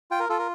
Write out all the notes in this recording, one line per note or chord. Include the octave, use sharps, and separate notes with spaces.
F4 G5
A#4
F4 A4
A#4